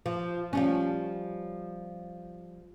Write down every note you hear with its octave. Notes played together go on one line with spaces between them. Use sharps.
F3
F3 G3 C#4